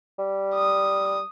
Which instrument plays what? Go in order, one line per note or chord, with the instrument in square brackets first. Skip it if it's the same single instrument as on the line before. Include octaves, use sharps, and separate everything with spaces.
[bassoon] G3
[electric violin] D#6